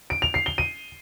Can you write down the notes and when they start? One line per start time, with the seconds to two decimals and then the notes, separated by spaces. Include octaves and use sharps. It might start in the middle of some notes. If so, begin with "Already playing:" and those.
0.10 D7
0.22 F7
0.34 C7
0.46 G7
0.58 D#7